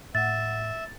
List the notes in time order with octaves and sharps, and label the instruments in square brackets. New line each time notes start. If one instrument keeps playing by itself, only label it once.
[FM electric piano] A2 F#5 [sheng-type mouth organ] E5 [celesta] A6